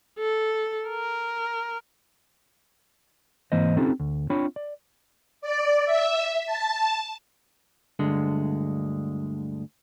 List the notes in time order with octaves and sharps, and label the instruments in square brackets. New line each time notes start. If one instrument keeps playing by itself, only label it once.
[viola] A4
A#4
[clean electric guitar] G#2 E3 A#3 C4 C5 D#5
C4 C#4 D#4 F4 G4 A4
D2
C4 D4 F4 C#5 G5 B5
D5
[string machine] D5
E5
A5
[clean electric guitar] D2 G2 D3 G#3